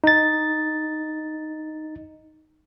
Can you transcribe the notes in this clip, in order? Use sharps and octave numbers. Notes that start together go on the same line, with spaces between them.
D#4 A6